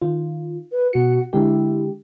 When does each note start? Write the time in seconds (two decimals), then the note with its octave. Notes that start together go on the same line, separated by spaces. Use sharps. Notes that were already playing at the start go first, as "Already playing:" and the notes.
0.01 D#3 F4
0.72 B4
0.93 B2 F#4 C#7
1.33 D3 G#3 E4 G4